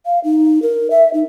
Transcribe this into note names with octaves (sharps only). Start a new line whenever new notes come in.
F5
D#4
A#4
E5
D#4